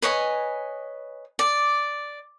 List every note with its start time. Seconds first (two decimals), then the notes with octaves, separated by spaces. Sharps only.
0.02 B4 C#5 D#5 G#5
1.39 D5